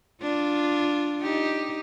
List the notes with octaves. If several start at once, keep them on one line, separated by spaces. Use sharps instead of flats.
D4 F4
D#4 G4